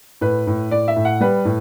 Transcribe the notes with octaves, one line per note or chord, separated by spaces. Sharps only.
A2 B4
A2
A2 D5
E5
A2
F#5
G3 B4
A2